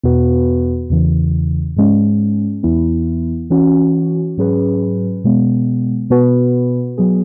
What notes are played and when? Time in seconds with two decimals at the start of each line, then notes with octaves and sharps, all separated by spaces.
0.03 E2 B2 B3 F#4 B4
0.90 E2 C#3 E3
1.77 G#2 G#3 C#4
2.63 E2 E3 B3 E4
3.50 E3 C#4 F#4
4.37 G#2 F#3 C#4 G#4 B4
5.24 B2 G#3 B3
6.10 B2 B3 F#4 B4
6.98 F#3 B3 G#4